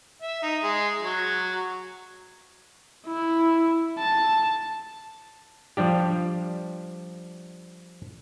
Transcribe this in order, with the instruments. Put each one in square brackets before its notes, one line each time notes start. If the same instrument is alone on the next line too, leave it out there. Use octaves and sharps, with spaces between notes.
[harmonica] E5
D#4
G#3
F#3
[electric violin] E4
A5
[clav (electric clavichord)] F3 G3 D4 G4